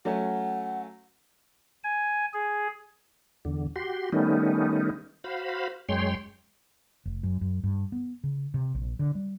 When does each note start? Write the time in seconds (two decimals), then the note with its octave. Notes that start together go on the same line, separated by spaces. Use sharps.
0.05 F#3 A3 C#4 F#5
1.84 G#5
2.33 G#4
3.45 E2 D3
3.76 F#4 G4 C6
4.12 D#3 G3 A3 B3 C#4 D#4
5.24 F#4 C5 F5 B5
5.89 F#2 G#3 C#5 G5 C6
7.05 F1
7.23 F#2
7.41 F#2
7.64 G2
7.92 B3
8.24 C#3
8.54 C3
8.74 A#1
8.99 D3
9.15 G3